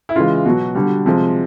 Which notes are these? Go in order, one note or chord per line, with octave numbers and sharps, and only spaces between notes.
E4
C#3 E3 G#3 F4
B2 F#3 F#4
D3 G3
C3 F3 G#3